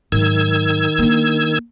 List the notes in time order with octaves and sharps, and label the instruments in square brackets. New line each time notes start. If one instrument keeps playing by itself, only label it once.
[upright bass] G#2 F#3 [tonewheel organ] D#3 E6 G#6
[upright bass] A#3 D4